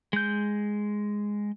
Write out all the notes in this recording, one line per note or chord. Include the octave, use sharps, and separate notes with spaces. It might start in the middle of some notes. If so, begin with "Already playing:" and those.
G#3 G6